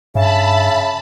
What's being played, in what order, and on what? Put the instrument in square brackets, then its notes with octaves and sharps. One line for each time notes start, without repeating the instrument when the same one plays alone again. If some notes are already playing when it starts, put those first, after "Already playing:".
[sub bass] G2 [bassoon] C#3 [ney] E5 [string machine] A5 B5